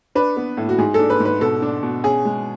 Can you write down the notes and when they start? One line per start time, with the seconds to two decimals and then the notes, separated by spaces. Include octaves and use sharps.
0.15 D4 B4
0.37 B3
0.57 A2
0.69 F#4
0.78 G#2 G#4
0.94 D4 A4
1.10 B4
1.20 G#2
1.25 B4
1.41 B2 A4
1.62 D4
1.83 B2
2.04 C#4 G#4
2.25 G#3